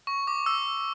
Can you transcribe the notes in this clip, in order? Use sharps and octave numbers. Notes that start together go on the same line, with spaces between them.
C#6
D6
E6